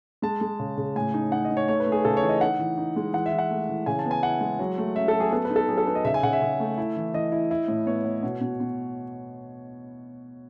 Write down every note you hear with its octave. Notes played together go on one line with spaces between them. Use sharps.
G#3 A5
G#3
C#3
C#3
A2 G#5
D#4
D#4 F#5
D#5
D#4
C#5
A3 C#5
B4
A3
G#4
C#3 A4
C#5
E3
D#5
D#4 F#5
E3
D#4
G#3
E3 F#5
E5
E3
F#5
A3
E3
C#3 G#5
A5
B3
G#5
E4 F#5
G#3
F#3
A3
C#4 E5
A4
F#3
G#4
B3 A4
B4
D#4
A4
F#3 G#4
A4
D#4 B4
D#5
C#3 E5
G#5
C#3 F#5
E5
C#3
A3
E4
E3
E3 D#5
E4
E4
A2
B3 C#5
B3
B2
B2
B2